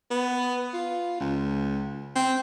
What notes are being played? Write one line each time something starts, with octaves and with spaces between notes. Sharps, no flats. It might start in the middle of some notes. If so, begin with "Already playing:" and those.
B3
F4
C#2
C4